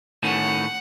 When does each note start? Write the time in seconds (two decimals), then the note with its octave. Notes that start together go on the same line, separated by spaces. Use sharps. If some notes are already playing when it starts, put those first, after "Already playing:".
0.23 A2 D#3 C#4 F#5